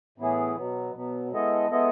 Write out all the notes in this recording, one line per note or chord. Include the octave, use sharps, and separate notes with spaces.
A2 E3 B3 E4 G#4
B2 F#3 B3
B2 F#3 B3
G#3 B3 E4 A4 D#5
G#3 B3 E4 A4 D#5